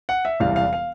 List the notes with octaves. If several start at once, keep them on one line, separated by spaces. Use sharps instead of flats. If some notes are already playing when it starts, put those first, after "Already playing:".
F#5
E5
E1 E2 C3 E3 G3 F5
F5
F5